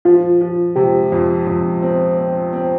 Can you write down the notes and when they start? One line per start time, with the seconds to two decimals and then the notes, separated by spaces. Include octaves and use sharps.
0.05 F3 F4
0.41 F3
0.76 C3 G4
1.12 F2
1.47 F2
1.82 C4
2.18 C4
2.53 C4